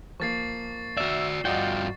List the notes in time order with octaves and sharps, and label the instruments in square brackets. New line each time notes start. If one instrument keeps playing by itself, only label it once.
[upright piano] F3 A#3 [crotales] C#6 A6 C7
[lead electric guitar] F#4 D5 [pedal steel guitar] E5
[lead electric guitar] G2 F#4 [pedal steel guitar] F4 G5 [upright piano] D5 D#5 F#5